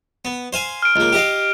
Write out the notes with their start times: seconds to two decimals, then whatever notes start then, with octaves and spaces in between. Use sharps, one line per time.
0.25 B3
0.53 C5 F5 G#5
0.82 F6 D7
0.96 C#2 A#3
1.13 G4 D#5 F5